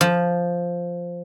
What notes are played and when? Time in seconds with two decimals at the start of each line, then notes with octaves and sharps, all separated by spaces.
0.01 F3